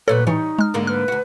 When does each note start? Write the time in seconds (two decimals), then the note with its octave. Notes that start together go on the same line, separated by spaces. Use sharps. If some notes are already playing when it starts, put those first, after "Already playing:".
0.08 G2 A#2 F#3 A4 B4 C#5
0.27 A2 E3 G3 D#4 C#5
0.59 G#3 F6
0.74 G#2 D3 A#3
0.87 B4 F6
1.08 D2 F#4